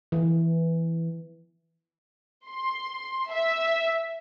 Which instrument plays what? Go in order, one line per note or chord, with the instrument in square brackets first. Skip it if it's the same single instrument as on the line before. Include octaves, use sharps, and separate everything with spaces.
[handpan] E3
[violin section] C6
E5